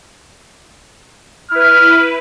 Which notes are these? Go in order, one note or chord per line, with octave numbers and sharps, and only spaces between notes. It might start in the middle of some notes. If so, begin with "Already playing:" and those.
E4 B4 F6